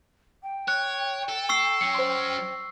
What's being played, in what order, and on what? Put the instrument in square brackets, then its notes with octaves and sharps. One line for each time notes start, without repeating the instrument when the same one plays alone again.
[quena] G5
[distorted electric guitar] C#5 [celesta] F#6
[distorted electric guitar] A4
[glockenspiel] C#6 E6 C7
[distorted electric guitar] F#3 C#4 [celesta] C#7
[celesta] C5 C6